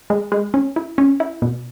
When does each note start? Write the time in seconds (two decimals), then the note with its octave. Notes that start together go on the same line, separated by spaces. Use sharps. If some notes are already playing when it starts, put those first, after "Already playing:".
0.10 G#3
0.32 G#3
0.54 C#4
0.76 E4
0.98 C#4
1.20 E4
1.42 B2